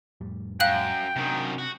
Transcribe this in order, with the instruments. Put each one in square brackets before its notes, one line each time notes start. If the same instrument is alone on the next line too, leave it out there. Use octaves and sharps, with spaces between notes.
[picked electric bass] F2 A2 G3
[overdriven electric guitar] F#2 [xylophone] F5 F#6 F#7 [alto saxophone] G5
[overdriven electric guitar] F#2 D#3 [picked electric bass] C3 C4 D4
[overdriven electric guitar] F#4